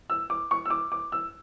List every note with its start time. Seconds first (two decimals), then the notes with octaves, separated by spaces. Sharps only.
0.10 E6
0.30 D6
0.51 C#6
0.65 E6
0.70 D6
0.92 D6
1.12 E6